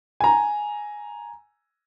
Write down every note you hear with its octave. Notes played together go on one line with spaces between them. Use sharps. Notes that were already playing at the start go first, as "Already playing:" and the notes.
G#5 A#5